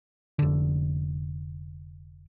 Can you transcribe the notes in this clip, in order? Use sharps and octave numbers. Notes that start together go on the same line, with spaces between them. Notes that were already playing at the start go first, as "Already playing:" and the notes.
F1 D3